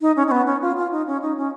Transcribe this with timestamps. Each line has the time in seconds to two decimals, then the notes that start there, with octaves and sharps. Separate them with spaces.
0.01 D#4
0.16 C#4
0.27 C#4
0.31 B3
0.47 C#4
0.62 F4
0.77 F4
0.92 D#4
1.07 C#4
1.22 D#4
1.37 C#4